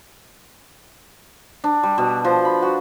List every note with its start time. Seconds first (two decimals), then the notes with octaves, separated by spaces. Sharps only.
1.64 D4
1.83 G3
1.98 B2
2.25 F3
2.45 B5
2.62 F#4